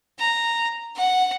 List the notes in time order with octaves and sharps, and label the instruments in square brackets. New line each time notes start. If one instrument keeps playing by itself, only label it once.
[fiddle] A#5
F#5